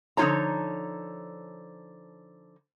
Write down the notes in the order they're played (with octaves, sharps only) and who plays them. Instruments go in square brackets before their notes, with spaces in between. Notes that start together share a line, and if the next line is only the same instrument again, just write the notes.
[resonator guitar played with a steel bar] D3 F3 D#4 F4 C#5 A#5